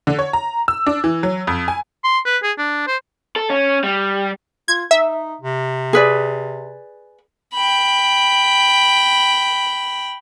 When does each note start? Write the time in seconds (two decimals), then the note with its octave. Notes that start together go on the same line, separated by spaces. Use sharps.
0.07 D3
0.19 C#5
0.33 A#5
0.68 E6
0.87 D4
1.04 E3
1.23 F#3
1.47 F2
1.68 G#5
2.04 C6
2.25 B4
2.43 G#4
2.58 D4
2.87 C5
3.36 A4
3.50 C#4
3.84 G3
4.68 F4 G#6
4.91 D#4 E5
5.41 C3
5.93 G#4 B4 D5
7.54 G5 B5